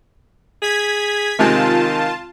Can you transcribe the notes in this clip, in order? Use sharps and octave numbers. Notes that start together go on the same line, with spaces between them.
G#4 G#6 B6
C3 D#3 G#3 C4 F4 A5